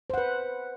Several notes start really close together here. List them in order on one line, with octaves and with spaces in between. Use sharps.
C5 F#5 B4